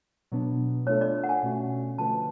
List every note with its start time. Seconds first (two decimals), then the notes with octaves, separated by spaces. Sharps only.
0.32 B2 F#3 B3 D4
0.87 A3 D4 F4 A4 C#5
1.01 D5
1.24 F#5
1.29 G#5
1.43 B2 A3 C#4 F#4
1.98 D3 F3 A3 F4 B4 A5